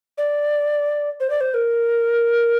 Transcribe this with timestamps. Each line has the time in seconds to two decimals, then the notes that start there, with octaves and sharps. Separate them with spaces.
0.18 D5
1.20 C5
1.30 D5
1.41 C5
1.54 A#4